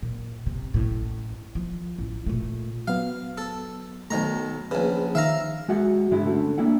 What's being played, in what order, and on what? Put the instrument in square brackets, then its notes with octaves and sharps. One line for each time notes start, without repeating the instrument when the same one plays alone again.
[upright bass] A#2
C3
A1 A2
F3
A1
A#2 A3
[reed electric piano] F#3 B3 [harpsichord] F5
[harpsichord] A4
[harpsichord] B1 D#3 A#5 [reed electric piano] A3
[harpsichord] A#1 C#3 [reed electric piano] B4
[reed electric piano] D#3 [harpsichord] E5 F5 A#5
[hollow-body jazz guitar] G#3 F#4 E5 F#5
G2 D3 G#3 E4 F#4
D3 A3 C#4
A#3 D4 E4 F#5